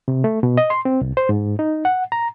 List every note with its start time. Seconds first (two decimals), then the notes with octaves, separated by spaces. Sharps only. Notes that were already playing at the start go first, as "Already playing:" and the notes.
0.08 C3
0.24 A3
0.43 B2
0.57 D#5
0.70 C6
0.85 C4
1.01 C2
1.17 C5
1.29 G#2
1.59 D#4
1.85 F#5
2.12 A#5